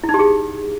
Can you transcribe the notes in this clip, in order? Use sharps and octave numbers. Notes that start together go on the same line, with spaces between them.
E4
D#4
G4
G#4